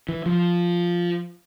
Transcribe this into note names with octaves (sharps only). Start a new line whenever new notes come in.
E3
F3